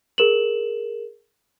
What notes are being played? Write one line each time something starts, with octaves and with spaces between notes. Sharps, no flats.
G#4 A#4 E7 F#7